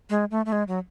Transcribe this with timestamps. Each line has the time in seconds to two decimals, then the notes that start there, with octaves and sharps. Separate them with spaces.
0.10 G#3
0.31 A3
0.46 A3
0.52 G#3
0.68 F#3